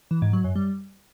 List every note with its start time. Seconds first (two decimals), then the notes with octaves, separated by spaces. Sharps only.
0.11 E3
0.22 G#2
0.33 F#3
0.44 F#2
0.55 G3